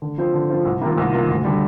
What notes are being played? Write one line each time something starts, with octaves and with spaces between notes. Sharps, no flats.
D3
F3 C4 F4 C5
D3
F3 C4 F4 C5
C2
C3 D#3 A#3 F4
C2
C3 D#3 A#3 F4
D2
D3 G3